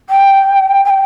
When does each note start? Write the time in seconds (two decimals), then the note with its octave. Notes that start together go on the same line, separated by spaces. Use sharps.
0.10 G5
0.85 G#5
0.90 G5